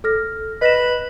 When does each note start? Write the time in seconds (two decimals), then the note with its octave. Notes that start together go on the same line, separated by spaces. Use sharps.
0.04 A4 F6 A#6
0.61 B4 D#5 A#6 E7